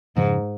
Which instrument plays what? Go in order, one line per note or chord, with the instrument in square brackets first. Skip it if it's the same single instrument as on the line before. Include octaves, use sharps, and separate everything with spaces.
[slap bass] F2 C#3 F3 G#3 [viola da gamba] G#2